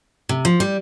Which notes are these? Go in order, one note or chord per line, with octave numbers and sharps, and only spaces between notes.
C3
F3
G3